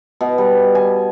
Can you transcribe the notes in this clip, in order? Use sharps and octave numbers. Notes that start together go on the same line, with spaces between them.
B2
G3
G#5